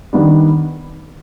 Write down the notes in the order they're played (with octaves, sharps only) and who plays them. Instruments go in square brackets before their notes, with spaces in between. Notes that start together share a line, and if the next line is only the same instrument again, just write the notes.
[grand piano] D#3 G3 B3 D4